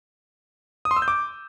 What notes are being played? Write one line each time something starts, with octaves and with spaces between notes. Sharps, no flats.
D#6
C6
E6
G6
D6